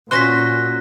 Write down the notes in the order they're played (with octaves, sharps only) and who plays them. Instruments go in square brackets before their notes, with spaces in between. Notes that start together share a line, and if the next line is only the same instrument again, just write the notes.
[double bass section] A#2 [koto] C#4 F#4 C5 [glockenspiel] F#6 A#6 B6